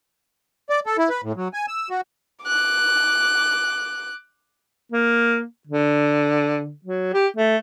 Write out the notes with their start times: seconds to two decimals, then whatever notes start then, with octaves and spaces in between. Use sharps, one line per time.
0.70 D5
0.86 A4
0.98 E4
1.09 B4
1.24 A2
1.36 F#3
1.54 G#5
1.68 E6
1.90 F#4
2.45 D6 F#6
4.92 A#3
5.67 D3
6.84 F#3
7.13 G4
7.37 A3